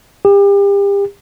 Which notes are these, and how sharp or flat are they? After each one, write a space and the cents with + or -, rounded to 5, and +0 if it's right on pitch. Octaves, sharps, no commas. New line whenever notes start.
G4 +35